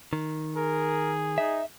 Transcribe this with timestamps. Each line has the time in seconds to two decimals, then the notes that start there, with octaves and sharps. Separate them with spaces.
0.13 D#3
0.56 G#4 A#4
1.38 D#4 E5